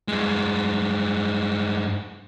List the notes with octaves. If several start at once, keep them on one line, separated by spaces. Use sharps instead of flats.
G2 G#3